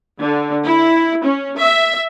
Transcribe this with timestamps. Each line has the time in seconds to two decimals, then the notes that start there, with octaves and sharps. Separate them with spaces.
0.20 D3
0.65 E4
1.24 C#4
1.57 E5